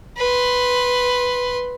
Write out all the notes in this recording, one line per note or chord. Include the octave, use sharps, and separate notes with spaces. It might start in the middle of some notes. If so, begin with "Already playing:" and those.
B4 C6